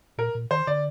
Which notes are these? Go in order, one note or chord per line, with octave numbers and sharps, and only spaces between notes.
A#2 A#4
A#2
D#3 C5
D3 D5